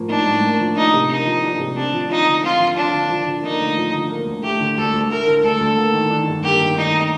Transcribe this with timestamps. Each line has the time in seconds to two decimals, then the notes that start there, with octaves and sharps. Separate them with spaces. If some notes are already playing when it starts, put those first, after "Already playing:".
Already playing: A2 F3 A#3
0.09 D4 D#4
0.27 A2
0.43 A#3
0.60 F3
0.76 D4 D#4
0.94 C3
1.09 A#3 D#4
1.26 F3
1.44 D4
1.60 C3
1.77 C4 D4
1.93 F3
2.09 D#4 F4
2.27 D3
2.44 C4 F4
2.60 F3
2.76 D4 F4
2.94 D3
3.10 F3
3.26 D3
3.43 A#3 D#4
3.60 D2
3.77 F3
3.93 D3
4.10 A#3
4.26 D2
4.43 A3 G4
4.60 D3
4.77 D2 A4
4.93 D2
5.10 A3 A#4
5.27 D3
5.43 D2 A4
5.61 D2
5.77 A#3
5.93 D#3
6.10 D4
6.28 G2
6.44 A#3 G4
6.61 D#3
6.77 D4 D#4